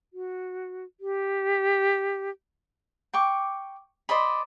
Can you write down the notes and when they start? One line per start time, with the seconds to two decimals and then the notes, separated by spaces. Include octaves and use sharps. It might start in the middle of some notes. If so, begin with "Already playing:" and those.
0.13 F#4
1.00 G4
3.13 G5 C#6 D6
4.09 C5 D5 D#5 B5